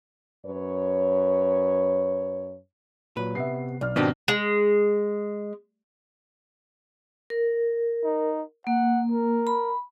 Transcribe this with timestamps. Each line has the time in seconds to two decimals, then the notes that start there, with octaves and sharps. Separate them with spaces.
0.46 F#2 B4 C#5
3.17 A#2 F#3 B4
3.35 C3 B3 E5 C7
3.81 B1 D5 F6
3.96 G#1 B2 D#3 C4 D4 D#4 G4
4.28 G#3
7.30 A#4
8.04 D#4
8.67 A#3 F#5
9.11 A#4
9.47 B5